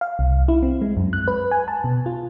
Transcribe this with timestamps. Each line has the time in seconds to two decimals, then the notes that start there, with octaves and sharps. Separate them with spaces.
0.01 F5
0.19 C2
0.48 E4
0.63 C4
0.82 G#3
0.97 F#2
1.13 F#6
1.28 B4
1.51 G#5
1.68 A5
1.84 B2
2.06 F4